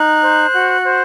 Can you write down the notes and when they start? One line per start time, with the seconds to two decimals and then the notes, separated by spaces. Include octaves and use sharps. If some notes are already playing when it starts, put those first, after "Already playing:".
Already playing: D#4 F#6
0.22 C5
0.52 F#4
0.84 C5